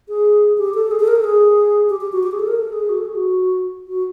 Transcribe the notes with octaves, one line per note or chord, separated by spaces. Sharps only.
G#4
G4
A4
G#4
A4
A#4
A4
G#4
G4
G4
F#4
G4
G#4
A4
A#4
A4
G#4
F#4
A4
G#4
F#4
F#4